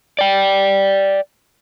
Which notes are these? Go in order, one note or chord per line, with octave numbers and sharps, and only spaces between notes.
D5 G5